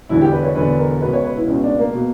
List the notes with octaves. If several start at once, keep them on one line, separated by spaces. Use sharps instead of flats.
E1 E2 D3 E4
G4
B4
C#5
E1 E2 D3 B4
A#4
C#2 B2 B4
C#5
B4
E4
C#2 B2 C#4
D4
A#3
B2